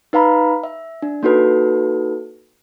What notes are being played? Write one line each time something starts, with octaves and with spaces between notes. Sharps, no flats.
D#4 B4 F5 A#5 B5
E5
D4
A#3 D#4 F#4 A4 B4